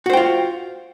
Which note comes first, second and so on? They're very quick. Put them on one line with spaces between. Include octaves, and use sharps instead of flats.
F#4 C5 G5 F4